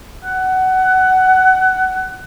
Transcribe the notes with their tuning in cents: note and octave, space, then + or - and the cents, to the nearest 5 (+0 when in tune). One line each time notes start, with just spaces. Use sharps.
F#5 +20